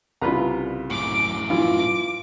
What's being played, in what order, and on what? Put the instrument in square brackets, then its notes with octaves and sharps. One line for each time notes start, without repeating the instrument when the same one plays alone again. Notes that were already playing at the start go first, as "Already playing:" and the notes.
[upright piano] C2 C#3 [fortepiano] F4 B4 A#5
[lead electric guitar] F#2 A2 [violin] D6
[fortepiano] E3 [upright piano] F4 [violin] D6